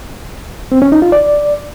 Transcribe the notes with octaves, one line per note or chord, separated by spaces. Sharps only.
C4
C#4
D#4
F4
D5